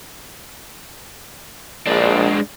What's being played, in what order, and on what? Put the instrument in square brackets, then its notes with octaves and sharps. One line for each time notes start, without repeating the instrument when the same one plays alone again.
[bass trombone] A#1 [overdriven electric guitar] G#3 D4